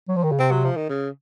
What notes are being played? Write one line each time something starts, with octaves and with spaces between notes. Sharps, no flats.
F#3
F3
D#3
C#3
C3 C4
F#3
F3
D#3
C#3